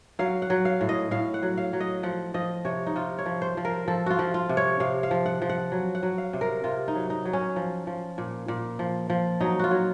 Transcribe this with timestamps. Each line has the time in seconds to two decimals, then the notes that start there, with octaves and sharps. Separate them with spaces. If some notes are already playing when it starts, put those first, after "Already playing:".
0.19 F#3 F5
0.42 F#5
0.50 F#3
0.65 F5
0.81 A2
0.89 D#5
1.11 A2 F5
1.34 F#5
1.42 F#3
1.57 F5
1.73 F#3
1.80 D#5
2.03 F3 F#5
2.34 F3 D#5
2.65 C3 C#5
2.86 D#4
2.96 C3 F4
3.19 C#5
3.26 F3
3.42 C5
3.57 F3
3.65 A#4
3.88 F3 A4
4.06 F4 F#4
4.19 F3
4.34 F4
4.49 C3
4.57 C#5
4.80 C3 F5
5.03 F5
5.11 F3
5.26 F#5
5.42 F3
5.49 F#5
5.72 F#3
5.95 F#5
6.03 F#3
6.18 F5
6.33 C3
6.41 A#4
6.64 C3 F4
6.88 D#4
6.95 F#3
7.10 D#4
7.25 F#3
7.33 C#4
7.56 F3
7.87 F3
8.18 A#2
8.48 A#2
8.79 F3
9.10 F3
9.40 F#3 D#4
9.59 F4 F#4
9.71 F#3